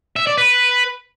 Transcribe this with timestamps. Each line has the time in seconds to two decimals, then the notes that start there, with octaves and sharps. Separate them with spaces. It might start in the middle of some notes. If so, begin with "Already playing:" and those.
0.16 E5
0.27 D5
0.38 B4